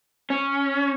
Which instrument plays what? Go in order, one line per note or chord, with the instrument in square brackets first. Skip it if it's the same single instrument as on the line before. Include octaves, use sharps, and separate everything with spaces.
[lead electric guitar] C#4